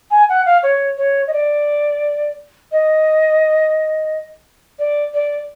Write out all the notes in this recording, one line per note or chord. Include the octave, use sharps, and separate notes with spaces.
G#5
F#5
F5
C#5
C#5
D#5
D5
D#5
D5
D5